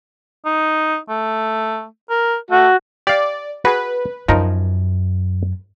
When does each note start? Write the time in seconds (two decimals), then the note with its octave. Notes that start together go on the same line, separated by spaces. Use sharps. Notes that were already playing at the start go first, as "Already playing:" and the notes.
0.45 D#4
1.09 A3
2.10 A#4
2.51 A3 F#4
3.07 G4 D5 F5
3.65 F#4 G#4 B4
4.28 F#2 F3 D#4 A#4